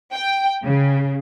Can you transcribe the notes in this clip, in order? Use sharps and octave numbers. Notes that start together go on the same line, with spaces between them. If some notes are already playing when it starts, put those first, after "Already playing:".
G5
C#3